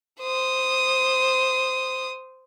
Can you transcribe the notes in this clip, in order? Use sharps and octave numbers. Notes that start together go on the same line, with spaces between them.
C5 D#6